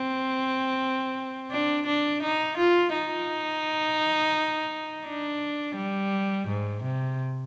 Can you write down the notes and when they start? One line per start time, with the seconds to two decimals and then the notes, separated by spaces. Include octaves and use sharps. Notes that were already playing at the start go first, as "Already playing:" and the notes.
Already playing: C4
1.51 D4
1.86 D4
2.22 D#4
2.57 F4
2.94 D#4
5.06 D4
5.76 G3
6.48 G#2
6.83 C3